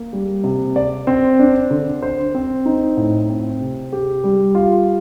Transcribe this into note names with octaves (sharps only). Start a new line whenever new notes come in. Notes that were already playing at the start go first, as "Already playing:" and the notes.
Already playing: A#3
G3
C3
D5
C4
D4
D3
C5
C4
D#4
A2
C4
C3
G4
G3
F4